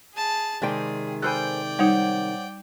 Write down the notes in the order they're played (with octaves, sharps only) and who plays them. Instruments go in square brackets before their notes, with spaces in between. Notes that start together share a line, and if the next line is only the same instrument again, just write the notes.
[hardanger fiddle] G#4 A5
[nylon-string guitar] C3 D#3 G#3 [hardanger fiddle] G#4 [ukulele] C5 D5 G5
[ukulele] A4 C5 G#5 [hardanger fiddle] D5 G5 [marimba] B5 F6 F#6
[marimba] G3 D#4 [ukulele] C5 C#5 F#5